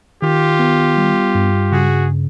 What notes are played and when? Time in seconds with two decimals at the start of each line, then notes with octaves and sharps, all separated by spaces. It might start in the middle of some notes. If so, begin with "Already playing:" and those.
0.21 D#3 F4 G4
0.59 B3
0.97 G3
1.35 G2
1.72 C#3 F#4 G#4